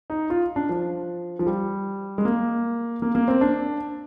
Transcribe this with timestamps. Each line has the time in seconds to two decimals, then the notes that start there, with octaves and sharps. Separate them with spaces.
0.10 D#4
0.30 F4
0.56 D4
0.69 F3
1.39 F3
1.47 G3
2.18 G#3
2.25 A#3
3.02 A#3
3.15 A#3
3.28 C4
3.41 D4